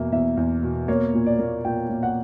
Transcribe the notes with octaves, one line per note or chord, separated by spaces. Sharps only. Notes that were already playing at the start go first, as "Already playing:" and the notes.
Already playing: E2 B2 A#3 E5
E2 E5
E2
B2
A#3 C#5
A#2
D5
A#3
A#2 G5
A#2
F#5